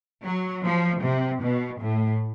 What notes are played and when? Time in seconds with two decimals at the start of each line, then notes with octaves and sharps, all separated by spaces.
0.22 F#3
0.62 F3
1.01 C3
1.41 B2
1.81 A2